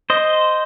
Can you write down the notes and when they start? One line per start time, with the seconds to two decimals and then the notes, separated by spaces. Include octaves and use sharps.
0.10 C5 D#5